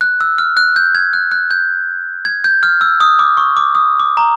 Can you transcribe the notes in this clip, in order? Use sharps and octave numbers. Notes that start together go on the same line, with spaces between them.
F#6
E6
F6
F#6
G6
G#6
F#6
F#6
G6
G#6
G6
F6
E6
D#6
D6
C#6
D6
D#6
D6
A#5